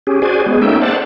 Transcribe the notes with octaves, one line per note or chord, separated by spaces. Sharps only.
C#4 G4 G#4
F#4 G#4 C5 D5 G#5
G#3 B3 G#4
A#3 C#4 D#4 A4 E5 G5
C5 D5 F#5 A5